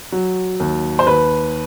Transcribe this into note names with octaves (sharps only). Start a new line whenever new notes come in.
F#3
D#2
C5
D#2 B4